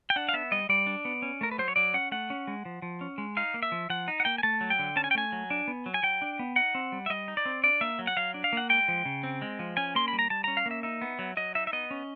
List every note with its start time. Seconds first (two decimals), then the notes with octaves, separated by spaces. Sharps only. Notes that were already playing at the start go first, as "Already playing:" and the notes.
0.10 G5
0.16 D4 F#5
0.29 F5
0.33 B3 E5
0.51 G3 D#5
0.69 G3 D5
0.87 D4
1.05 B3
1.22 C#4
1.41 A3 A#4
1.51 B4
1.58 F#3 C5
1.68 C#5
1.76 F#3 D5
1.94 C#4 F#5
2.12 A3 F#5
2.30 C#4
2.47 G#3
2.65 F3
2.82 F3
3.01 C#4
3.18 G#3
3.37 D#4 F5
3.54 A#3
3.63 E5
3.72 F3
3.90 F3 F#5
4.08 D#4
4.20 F#5
4.25 A#3 G5
4.38 G#5
4.43 A3 A5
4.61 F#3
4.70 G5
4.79 D3
4.96 C#4 A5
5.04 G#5
5.11 G5
5.15 A3 G#5
5.32 F#3
5.50 D4
5.68 B3
5.86 F#3
5.94 G#5
6.03 F#3 G5
6.22 D4
6.39 B3
6.56 D#4 F#5
6.75 C4
6.92 G3
7.06 E5
7.10 G3 D#5
7.28 D#4
7.37 D5
7.45 C4
7.63 D4 D5
7.81 A#3 E5
7.99 F#3
8.07 F#5
8.17 F#3 F5
8.34 D4
8.44 F5
8.53 A#3 F#5
8.70 G#3 G5
8.88 F3
9.05 C#3
9.23 C4
9.42 G#3
9.59 F3
9.77 C#4 G#5
9.95 A#3 C6
10.08 B5
10.13 G3
10.19 A#5
10.30 G3 A5
10.44 C#4 A#5
10.57 F5
10.66 A#3 E5
10.83 D#4 E5
11.02 B3
11.19 F#3
11.37 F#3 D#5
11.55 D#4 E5
11.67 E5
11.73 B3 D#5
11.91 C#4